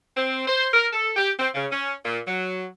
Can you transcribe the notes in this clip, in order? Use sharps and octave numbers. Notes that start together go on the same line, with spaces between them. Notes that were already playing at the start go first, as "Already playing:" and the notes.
C4
C5
A#4
A4
G4
C4
C#3
C#4
A#2
F#3